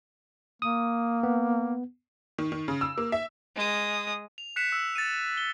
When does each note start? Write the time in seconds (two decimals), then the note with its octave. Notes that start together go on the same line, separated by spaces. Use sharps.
0.62 A#3 D#6
1.23 B3
2.38 D#3
2.52 D#3
2.68 C#3
2.81 E6
2.97 A#3
3.12 E5
3.56 G#3 D#6
4.38 F7
4.56 F#6 B6 C#7 E7
4.72 E6
4.96 A6 C#7 D#7
5.37 G7